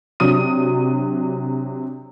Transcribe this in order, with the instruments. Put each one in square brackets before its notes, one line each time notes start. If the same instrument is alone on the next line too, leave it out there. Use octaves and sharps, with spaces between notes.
[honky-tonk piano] C3 F#3 D4 D#6 D#7